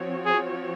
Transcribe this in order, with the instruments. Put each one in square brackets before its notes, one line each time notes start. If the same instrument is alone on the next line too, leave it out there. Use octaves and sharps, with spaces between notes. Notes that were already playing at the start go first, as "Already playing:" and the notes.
Already playing: [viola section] F3 C4 F#4 C#5
[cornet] G#4